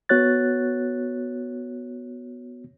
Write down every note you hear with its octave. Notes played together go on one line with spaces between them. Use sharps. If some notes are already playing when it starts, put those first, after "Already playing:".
B3 F#4 C#5 F#6 A6